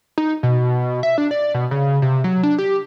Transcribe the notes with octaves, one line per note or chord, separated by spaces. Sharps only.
D#4
B2
E5
D4
D5
B2
C#3
C3
F#3
D4
G4